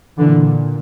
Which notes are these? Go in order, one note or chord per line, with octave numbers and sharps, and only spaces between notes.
A#2 D3 E3